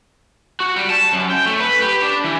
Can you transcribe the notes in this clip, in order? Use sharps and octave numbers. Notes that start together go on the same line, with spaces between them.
F#4
G3
A5
F#2
G5
A3
B4
G4
D4
E3